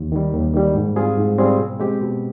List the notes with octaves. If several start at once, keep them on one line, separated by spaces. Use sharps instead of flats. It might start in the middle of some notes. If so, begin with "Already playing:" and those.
Already playing: D#2
D#3 G3
D#2
D#3 G3
G#2
G3 C4 F4 G#4
G#2
G3 C4 F4 G#4
B2
G#3 C4 G4
B2